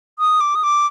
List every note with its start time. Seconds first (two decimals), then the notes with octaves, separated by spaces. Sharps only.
0.19 D#6
0.40 D6
0.55 D#6
0.63 D6